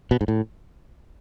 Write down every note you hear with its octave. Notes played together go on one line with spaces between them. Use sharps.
B2
G#2
A2